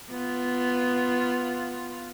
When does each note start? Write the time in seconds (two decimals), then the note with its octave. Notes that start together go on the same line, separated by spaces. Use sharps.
0.11 B3 F4